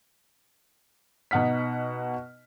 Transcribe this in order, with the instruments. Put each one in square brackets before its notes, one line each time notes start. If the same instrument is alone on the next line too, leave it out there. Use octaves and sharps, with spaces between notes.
[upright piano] B2 D#4 F#5 F6 B6